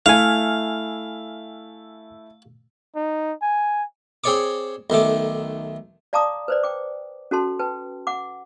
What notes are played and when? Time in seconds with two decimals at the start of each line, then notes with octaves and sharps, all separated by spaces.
0.06 A3 E4 F5 G#5 F6
2.96 D#4
3.42 G#5
4.24 C4 G#4 C#5 D5 C#6 D6
4.90 B1 D#3 A3 D6
6.13 D5 F5 A5 A#5 D6 D#6
6.48 B4 C5 D5
6.63 G5 D6
7.31 C#4 F#4 A4 A5 C6
7.59 B4 G5 A5
8.07 F#5 D6